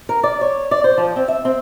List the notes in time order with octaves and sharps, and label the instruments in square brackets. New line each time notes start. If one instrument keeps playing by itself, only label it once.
[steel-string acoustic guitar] A#4
D5
C#5
D5
C5
F3
C4
E5
C4